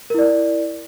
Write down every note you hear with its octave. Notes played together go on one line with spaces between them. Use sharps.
E4 A#4 D5